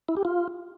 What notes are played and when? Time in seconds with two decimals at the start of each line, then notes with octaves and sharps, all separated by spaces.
0.09 E4
0.17 G4
0.25 F4